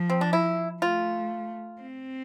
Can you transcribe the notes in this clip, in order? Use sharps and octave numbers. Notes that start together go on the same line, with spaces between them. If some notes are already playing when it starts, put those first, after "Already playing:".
Already playing: F3
C4
D4
E4
A3 F4
C4